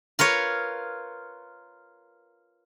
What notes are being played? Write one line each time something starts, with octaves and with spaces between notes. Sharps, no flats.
F4 A#4 B4 C#5